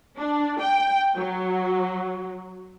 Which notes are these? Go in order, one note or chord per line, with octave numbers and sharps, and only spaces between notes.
D4
G5
F#3